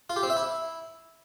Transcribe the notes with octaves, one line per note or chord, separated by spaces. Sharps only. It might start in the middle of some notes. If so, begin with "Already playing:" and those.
F4
G4
C4
E5
E4